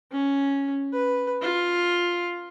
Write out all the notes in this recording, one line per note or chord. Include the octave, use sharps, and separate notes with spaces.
C#4
B4
F4